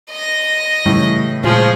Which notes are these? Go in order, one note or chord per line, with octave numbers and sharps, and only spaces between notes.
D#5 A#6
A2 C#3 E3 G3 A3
A#2 F3 G#3 G#4